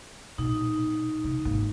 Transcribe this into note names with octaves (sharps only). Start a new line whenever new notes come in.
A#1 B2 D#4
C3
G#1 A#3